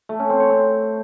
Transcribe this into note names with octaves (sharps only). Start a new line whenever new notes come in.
A3
C#4
C4
C#5
C4